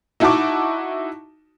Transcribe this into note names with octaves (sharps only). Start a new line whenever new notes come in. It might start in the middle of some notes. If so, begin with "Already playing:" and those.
D#4 E4 F#4 A5 C#6 D6